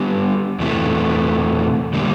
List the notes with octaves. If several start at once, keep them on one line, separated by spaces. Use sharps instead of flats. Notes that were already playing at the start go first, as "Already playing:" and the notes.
Already playing: G3 B3 D4 G4 B4
E2 C3 E3 A3
D3 G3 A#3